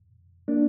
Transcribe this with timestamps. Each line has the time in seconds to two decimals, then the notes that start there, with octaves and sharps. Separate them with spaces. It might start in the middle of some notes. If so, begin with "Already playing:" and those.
0.48 A#3 D4